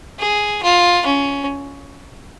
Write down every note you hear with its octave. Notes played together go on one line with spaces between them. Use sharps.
G#4
F4
C#4